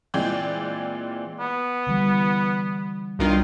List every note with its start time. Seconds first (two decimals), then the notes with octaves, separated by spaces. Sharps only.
0.14 A#2 E3 G#3 C4 D5 G6
1.40 B3
1.87 D3 E3 G3
3.19 B1 D#3 G3 D4 E4 F4